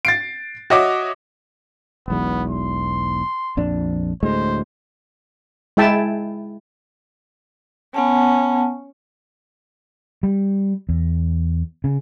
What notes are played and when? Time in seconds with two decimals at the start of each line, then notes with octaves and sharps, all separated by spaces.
0.05 A6 C7 D7
0.70 F#4 C#5 D#5 E5 D6
2.08 E1 B1 E2 B3
2.50 C6
3.57 A#1 F2 D4
4.23 D2 A2 G#3 C5
5.77 G#3 E4 E5 G5 A5
7.94 B3 C#4 F#5 A5
10.23 G3
10.89 E2
11.84 C#3